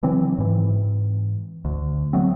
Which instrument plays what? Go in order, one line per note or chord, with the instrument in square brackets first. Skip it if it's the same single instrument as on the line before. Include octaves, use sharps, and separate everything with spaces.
[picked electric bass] C#3 E3 F#3 C4
G#2 E3
D2
F#3 A3 B3 C4